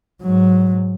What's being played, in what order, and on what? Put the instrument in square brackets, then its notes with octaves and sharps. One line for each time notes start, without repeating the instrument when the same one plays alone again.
[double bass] G#2 F#3